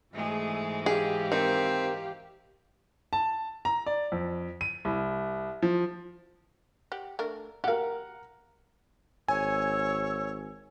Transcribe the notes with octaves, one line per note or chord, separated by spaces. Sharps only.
G#2 E3 G#3 A3 G#4
G4 G#4 F5
D#3 C4
A5
A#5
D5
F2
D#7
C2
F3
G4 F#5
A3 D4 A#4
G4 A#4 F5 F#5
G#1 C#5 G#5 E6